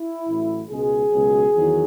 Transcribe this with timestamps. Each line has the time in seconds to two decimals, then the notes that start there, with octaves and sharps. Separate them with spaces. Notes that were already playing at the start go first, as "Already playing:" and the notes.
Already playing: E4
0.27 A1 A2 F#3
0.70 C#2 B2 G#3 G#4
1.11 C#2 B2 F#3
1.53 E2 D#3 F#3